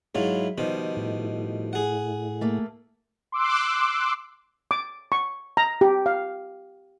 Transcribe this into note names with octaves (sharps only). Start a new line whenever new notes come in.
G#2 F#3 E4 F4
B2 D#3 F3 G3
A2
G#4 F#5
A3 A#3
C6 D6 E6 F#6
D6
C#6
A#5
G4
F5